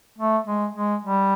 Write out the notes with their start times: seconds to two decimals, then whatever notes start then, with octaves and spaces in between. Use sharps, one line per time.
0.18 A3
0.47 G#3
0.76 G#3
1.05 G3